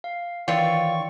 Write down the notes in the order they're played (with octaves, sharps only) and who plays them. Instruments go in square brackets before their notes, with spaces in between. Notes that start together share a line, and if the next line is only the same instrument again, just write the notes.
[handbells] F5
[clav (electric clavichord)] D#3 E3 [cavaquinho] F4 C#5 [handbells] D5 G5 E6 [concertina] C#6